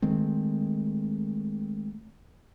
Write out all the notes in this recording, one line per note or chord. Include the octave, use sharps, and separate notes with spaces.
D#3 G#3 A3 C4